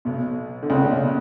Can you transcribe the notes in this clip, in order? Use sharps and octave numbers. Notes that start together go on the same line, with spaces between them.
B1 B2
D3
C#2 C#3
B1 B2
B2